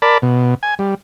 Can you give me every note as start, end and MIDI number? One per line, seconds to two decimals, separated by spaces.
0.02 0.18 70
0.02 0.18 74
0.02 0.18 81
0.02 0.18 83
0.22 0.55 47
0.63 0.75 80
0.79 0.95 55